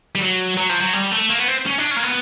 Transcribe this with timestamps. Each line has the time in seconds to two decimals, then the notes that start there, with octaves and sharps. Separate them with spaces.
0.15 G3
0.20 F#3
0.57 F#3
0.69 F3
0.81 F#3
0.93 G3
1.11 A3
1.30 A#3
1.39 B3
1.48 C4
1.66 C#4
1.78 D4
1.91 C#4
1.96 A#3
2.03 B3